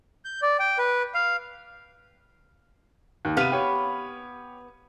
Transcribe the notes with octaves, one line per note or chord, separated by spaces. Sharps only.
G6
D5
G5
B4
F5
D#2
C3 B3 B4 F5 D#7
G4 C#5